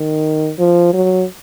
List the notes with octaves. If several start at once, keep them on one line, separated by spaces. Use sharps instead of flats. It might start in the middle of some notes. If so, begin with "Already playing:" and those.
Already playing: D#3
F3
F#3